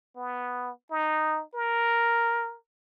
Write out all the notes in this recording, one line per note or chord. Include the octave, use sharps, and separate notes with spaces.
B3
D#4
A#4